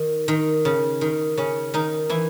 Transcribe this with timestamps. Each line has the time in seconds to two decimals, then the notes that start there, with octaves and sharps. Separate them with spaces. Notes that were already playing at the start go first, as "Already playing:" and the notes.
Already playing: D#3
0.28 D#3
0.65 C#3
1.01 D#3
1.37 C#3 C#4
1.74 D#3 D#4
2.09 E3 E4